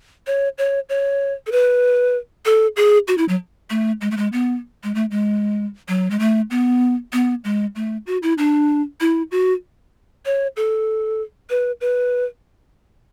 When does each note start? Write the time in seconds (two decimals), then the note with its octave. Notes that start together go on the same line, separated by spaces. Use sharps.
0.27 C#5
0.58 C#5
0.89 C#5
1.47 A4
1.52 B4
2.45 A4
2.76 G#4
3.08 F#4
3.18 E4
3.29 F#3
3.70 A3
4.01 G#3
4.11 A3
4.17 G#3
4.32 B3
4.84 G#3
4.95 A3
5.11 G#3
5.88 F#3
6.11 G#3
6.19 A3
6.51 B3
7.13 B3
7.44 G#3
7.75 A3
8.07 F#4
8.23 E4
8.38 D4
9.01 E4
9.31 F#4
10.26 C#5
10.57 A4
11.50 B4
11.81 B4